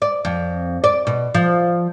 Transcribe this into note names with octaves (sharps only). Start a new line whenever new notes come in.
D5
F2
D5
B2
F3